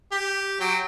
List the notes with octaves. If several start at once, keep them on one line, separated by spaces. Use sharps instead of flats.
G4
F#3 G5